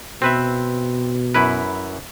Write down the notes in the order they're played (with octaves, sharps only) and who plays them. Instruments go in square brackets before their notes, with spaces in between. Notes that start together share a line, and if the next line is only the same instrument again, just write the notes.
[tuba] B2 [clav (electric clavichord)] C4 B4 E5
[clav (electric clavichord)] F#2 E4 B4